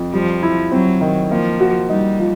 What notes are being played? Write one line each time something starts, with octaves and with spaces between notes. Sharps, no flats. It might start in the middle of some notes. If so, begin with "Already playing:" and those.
Already playing: F2
F3 G3
E4
F#3 C4
D#3
F3 A#3
F#4
G3 D#4
F3